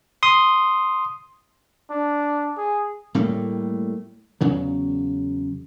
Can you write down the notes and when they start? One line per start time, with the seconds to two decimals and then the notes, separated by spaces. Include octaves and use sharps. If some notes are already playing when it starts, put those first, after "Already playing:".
0.23 C6 D#6
1.91 D4
2.57 G#4
3.15 A2 G3 A3 A#3
4.41 E2 C#3 F#3